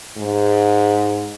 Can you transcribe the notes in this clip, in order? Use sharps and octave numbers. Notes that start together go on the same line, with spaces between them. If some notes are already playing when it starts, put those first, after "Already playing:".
G#2